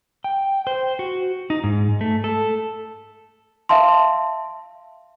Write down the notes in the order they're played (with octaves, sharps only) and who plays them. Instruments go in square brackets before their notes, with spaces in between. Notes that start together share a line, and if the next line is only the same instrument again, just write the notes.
[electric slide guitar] G5
C5
F#4
D#4
G#2
A3
A4
[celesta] E5 F5 A5 C6